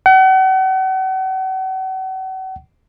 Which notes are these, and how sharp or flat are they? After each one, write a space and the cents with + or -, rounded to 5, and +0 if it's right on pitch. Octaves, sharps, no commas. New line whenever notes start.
F#5 +40